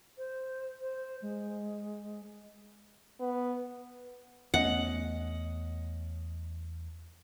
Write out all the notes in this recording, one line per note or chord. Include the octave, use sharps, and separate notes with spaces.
C5
C5
G#3
B3
E2 A3 B3 C#4 D#5 F#5